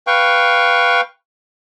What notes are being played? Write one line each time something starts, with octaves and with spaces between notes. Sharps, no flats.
B4 F5 G5 C#6